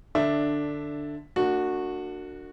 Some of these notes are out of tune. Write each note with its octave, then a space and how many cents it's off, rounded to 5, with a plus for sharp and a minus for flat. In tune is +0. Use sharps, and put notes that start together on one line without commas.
D3 +10 D4 +0 E5 +0
A#3 -40 D4 +20 F#4 -10